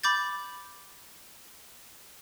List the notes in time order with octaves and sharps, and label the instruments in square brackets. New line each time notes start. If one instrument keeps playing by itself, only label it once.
[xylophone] B5 D6 G6 A6